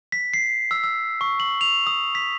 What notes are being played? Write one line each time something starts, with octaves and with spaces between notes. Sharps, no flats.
B6
C7
E6
E6
C#6
F#7
F7
D#6
B6